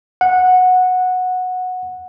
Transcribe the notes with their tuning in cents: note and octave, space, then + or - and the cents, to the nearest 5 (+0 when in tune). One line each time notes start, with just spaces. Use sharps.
F#5 -10